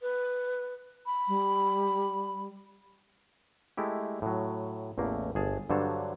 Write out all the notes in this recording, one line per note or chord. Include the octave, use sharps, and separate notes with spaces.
B4
B5
G3
G#3 A3 E4 G4
A2 F#3
A1 E2 A3 A#3
G1 G#4 A5
G2 D3 F#3 C5 C#5 A5